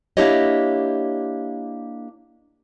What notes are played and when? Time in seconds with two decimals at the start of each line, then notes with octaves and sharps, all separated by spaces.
0.17 A#3 D4 E4 G4 C#5 D#5